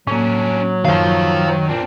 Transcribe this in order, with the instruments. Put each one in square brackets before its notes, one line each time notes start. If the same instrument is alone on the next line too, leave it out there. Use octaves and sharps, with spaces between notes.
[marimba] A2 A#3 [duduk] F#3 [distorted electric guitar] C#4 D4
[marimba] F#2 [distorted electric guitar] D#3 [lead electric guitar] C5 F5
[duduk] A#2 [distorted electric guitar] C4 D4